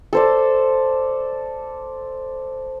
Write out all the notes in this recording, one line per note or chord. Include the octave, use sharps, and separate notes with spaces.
A4 C5 D5